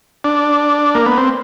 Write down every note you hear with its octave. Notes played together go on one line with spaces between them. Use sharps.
D4
A#3
B3
C4